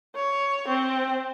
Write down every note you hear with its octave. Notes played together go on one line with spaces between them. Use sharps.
C#5
C4